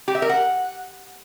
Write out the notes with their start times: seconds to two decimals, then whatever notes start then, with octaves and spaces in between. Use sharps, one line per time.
0.08 G4
0.15 E5
0.22 A#4
0.29 F#5